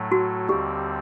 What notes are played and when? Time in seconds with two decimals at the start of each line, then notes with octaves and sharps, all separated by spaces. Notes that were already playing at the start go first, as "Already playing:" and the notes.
Already playing: A2 F#3 A3
0.12 F#4
0.49 D#2 D3 G3 C4 G4